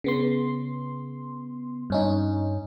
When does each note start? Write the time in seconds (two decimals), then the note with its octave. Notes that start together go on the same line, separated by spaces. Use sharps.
0.04 C#3 B3 C6
1.90 G2 C#4 D#4